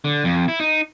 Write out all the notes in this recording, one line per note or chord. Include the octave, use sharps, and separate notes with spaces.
D3
F2
E4
D#4